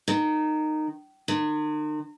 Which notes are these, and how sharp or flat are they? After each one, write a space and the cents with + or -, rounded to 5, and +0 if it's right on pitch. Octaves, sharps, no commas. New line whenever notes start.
D#3 -15
D#3 -40